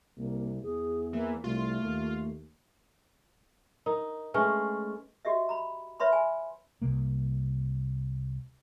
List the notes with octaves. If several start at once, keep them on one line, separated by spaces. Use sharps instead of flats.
C2 A#3
E2 G#4
E3 A#3
C2 A3 F4
D#2
D#4 A#4
G#3 A3 C#4 B4 G#5 F6
F#4 G4 D#5 E5
A#5 B5
B4 C#5 E5 B5 C6
G#5
C2 C3 A#3